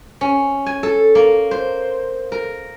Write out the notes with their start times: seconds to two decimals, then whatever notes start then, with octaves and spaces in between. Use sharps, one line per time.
0.21 C#4
0.66 G#5
0.83 A4
1.15 A#3
1.51 C5
2.32 A#4